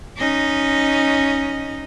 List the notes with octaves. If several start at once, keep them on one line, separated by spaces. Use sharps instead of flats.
C#4 D#4 D#5